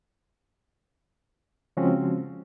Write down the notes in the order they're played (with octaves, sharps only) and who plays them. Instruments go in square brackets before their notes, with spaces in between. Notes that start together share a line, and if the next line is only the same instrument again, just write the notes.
[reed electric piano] C#3 F3 G#3 C4 C#4 F#4